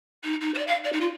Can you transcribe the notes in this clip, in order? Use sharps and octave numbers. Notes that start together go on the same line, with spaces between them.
D#4
D#4
C5
D5
F5
D5
D#4
F4